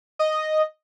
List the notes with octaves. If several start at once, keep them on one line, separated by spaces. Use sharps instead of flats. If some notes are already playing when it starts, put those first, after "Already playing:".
D#5